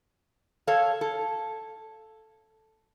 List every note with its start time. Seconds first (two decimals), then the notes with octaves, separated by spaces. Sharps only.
0.67 A4 C#5 F5
1.01 A4